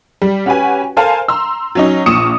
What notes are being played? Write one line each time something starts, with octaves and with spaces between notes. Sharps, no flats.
G3
C#4 F#4 G4 B4 G#5
A4 A#4 C5 F5 G#5 A5
A#5 C6 E6
F#3 C#4 D#4
A#1 A#2 C#6 D#6 C#7 E7